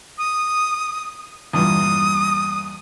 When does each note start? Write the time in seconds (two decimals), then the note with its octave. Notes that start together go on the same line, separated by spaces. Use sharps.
0.18 D#6
1.53 E2 G2 A#2 D#6